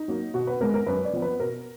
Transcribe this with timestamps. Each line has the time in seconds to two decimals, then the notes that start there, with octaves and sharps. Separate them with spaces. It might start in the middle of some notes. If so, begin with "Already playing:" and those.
Already playing: D#4
0.08 F#3 A#3
0.34 B2 F#4
0.47 B4
0.61 G#3 B3 A#4
0.74 A#4
0.86 F#2 B4
1.05 D5
1.13 F3 B3
1.22 B4
1.40 B2 A#4